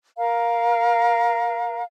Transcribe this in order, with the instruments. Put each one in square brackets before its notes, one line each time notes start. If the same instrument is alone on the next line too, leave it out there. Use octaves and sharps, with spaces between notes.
[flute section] A#4 F5 A#5